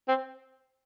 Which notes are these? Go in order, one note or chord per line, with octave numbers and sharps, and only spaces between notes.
C4